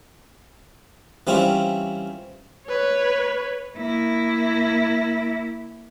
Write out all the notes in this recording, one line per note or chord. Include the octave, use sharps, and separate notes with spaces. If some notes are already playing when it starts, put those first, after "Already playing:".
E3 G3 C4 C#4 E4 F4
B4 C#5
A#3 E4